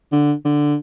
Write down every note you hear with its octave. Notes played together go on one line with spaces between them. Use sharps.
D3
D3